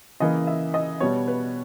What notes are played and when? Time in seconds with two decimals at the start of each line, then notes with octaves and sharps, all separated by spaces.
0.20 C#3 E3 A#3 D#5
0.47 E5
0.74 D#5
1.00 B2 G3 B3 C#5
1.28 B4